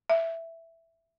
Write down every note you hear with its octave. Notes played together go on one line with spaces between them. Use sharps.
E5